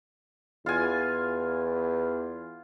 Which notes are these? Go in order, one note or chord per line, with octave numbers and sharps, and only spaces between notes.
E2 F4 G#5